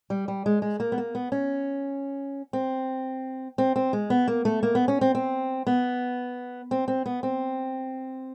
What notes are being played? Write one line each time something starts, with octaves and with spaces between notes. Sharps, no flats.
G3
G3
G#3
G#3
A#3
B3
A#3
B3
C#4
C4
C4
C4
G#3
B3
A#3
A3
A#3
B3
C#4
C4
C4
B3
C4
C4
B3
C4